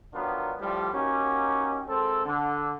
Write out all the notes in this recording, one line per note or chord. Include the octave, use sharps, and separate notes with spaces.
D#3 F#3 B3 D4 F4
A2 F3 G3
A#3 C#4 D#4 F#4 G4
G#1 C4 A4
D3